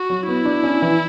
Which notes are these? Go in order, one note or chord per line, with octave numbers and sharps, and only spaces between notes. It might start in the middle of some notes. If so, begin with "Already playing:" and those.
Already playing: F#4
F#3
B3 E4
D4
C#4
E3